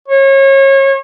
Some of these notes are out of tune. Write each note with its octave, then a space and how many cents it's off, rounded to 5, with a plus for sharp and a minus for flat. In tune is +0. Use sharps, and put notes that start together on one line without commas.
C#5 -30